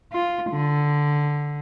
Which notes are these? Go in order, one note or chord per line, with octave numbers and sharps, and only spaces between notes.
F4
D3